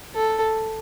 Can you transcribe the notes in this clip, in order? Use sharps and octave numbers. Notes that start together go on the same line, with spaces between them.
A4